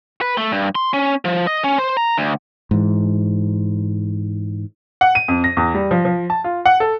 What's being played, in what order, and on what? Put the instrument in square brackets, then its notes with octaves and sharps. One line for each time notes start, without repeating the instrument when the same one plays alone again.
[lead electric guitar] B4
A3
G2
C6
C#4
F3
D#5
C#4
C5
A#5
D2
[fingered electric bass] G#2 E3
[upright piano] F#5
D#7
F2
A#6
E2
G3
F3
F3
A5
F4
F#5
A4